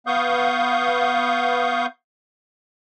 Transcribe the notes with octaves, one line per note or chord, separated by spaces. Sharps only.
B3 F5 C#6 D#6 G6